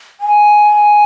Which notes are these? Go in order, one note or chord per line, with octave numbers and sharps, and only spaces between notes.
G#5